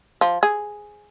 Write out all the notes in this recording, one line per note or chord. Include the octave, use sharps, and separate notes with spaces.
F3
G#4